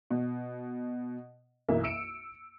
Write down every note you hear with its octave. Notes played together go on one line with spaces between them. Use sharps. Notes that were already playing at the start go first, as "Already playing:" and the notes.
B2
B1 F#2 E3 A#3 E5
E6 C#7 D7 E7